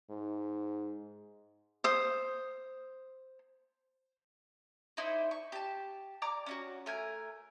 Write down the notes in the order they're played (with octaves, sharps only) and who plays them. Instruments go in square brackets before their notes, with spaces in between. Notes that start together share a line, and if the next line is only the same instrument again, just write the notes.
[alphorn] G#2
[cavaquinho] C5 D#6
[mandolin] D#4 E4 C5 D5
C#6
G4 A5
D5 A#5 D6
C#4 D#4 F#4
A3 A#4 G#5